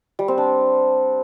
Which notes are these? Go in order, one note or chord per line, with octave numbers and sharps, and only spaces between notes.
G3
C4
D4